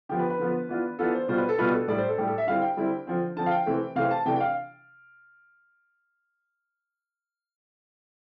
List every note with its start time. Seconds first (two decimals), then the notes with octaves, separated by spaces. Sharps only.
0.09 D3 F3 B3 G4
0.19 B4
0.30 B4
0.39 D3 F3 B3
0.69 E3 B3 D4 F4
0.99 E3 B3 D4 F4 A4
1.14 C5
1.28 B2 G3 D4 F4 C5
1.38 B4
1.49 A4
1.58 B2 G3 D4 F4 B4
1.74 A4
1.88 A2 G3 D4 D5
1.98 C5
2.08 A4
2.18 A2 G3 D4 G4
2.27 A4
2.38 E5
2.47 D3 G3 C4 E4 F5
2.62 G5
2.77 D3 G3 C4 E4
3.07 D3 F3 C4
3.36 D3 F3 C4 A5
3.46 F5
3.51 G5
3.66 C3 E3 A3 C4
3.95 C3 E3 A3 C4 F5
4.11 A5
4.25 C3 E3 A3 D4 G5
4.36 G5
4.40 F5